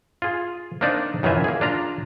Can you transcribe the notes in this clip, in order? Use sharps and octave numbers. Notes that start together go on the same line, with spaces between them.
F4 G#4
A#3 C4 D4 D#4 D5
F#2 D#3 E3 F4 E5 G#5
A#3 G#4
D4 F4 A#5